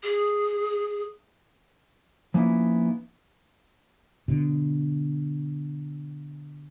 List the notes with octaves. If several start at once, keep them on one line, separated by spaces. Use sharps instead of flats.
G#4
F3 A#3 B3 C#4 D#4 E4
B2 D3